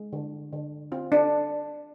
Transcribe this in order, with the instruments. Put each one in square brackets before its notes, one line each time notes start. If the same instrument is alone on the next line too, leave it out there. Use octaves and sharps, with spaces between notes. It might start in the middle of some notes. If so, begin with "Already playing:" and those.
Already playing: [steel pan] G#3
D3
D3
C4 F4
D4